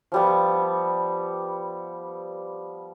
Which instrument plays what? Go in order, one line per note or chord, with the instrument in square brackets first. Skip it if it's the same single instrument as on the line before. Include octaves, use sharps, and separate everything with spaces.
[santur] F3 G3 B3